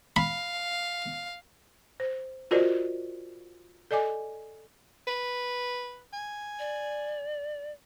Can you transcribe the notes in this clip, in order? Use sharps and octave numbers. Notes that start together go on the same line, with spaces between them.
F5 B5
C5
F4 F#4 A#4 C5 D5 D#5
A4 D5 D#5 G#5 D6
B4
G#5
D5